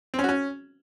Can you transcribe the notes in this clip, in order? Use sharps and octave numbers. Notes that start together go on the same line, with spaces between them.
C4
C#4
F#4
C#4